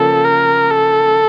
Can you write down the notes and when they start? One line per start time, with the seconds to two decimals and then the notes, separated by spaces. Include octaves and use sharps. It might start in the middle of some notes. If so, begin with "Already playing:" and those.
Already playing: C#3 F3 A#3 C#4 A4
0.25 A#4
0.71 A4